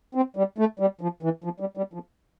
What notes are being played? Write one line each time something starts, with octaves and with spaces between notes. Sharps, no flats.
C4
G3
A3
G3
F3
E3
F3
G3
G3
F3